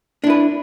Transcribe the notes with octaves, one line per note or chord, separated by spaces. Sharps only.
D4 E4 B4